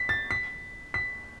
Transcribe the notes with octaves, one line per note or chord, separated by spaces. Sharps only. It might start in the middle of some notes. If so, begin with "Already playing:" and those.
Already playing: B6
A6
B6
B6